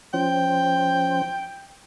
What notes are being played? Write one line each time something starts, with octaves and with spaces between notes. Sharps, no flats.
F3 C#4 C5 G5